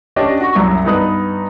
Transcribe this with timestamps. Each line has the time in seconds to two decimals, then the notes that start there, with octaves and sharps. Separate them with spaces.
0.16 C#4 D4 G4 D5 D#5
0.41 F#4 C#6
0.55 C2 F#2 E5 A#5
0.85 G2 B3 D#4 B4 D#6 F#6